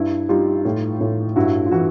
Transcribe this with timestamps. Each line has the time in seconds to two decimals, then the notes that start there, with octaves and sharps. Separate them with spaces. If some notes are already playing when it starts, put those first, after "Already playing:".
Already playing: G2 E4
0.29 G3 D#4 F4
0.65 A2
1.01 A2
1.36 G2 E4 F#4
1.66 F4
1.71 E3 E4 F#4